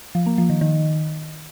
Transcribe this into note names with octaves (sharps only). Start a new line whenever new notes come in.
F3
A#3
F3
D#3
D#3